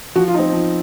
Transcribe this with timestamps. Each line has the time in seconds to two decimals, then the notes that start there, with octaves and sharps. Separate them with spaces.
0.15 F3 F#4
0.28 F4
0.34 C4 D#4
0.53 F3